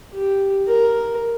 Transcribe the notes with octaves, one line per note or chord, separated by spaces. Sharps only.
G4
A#4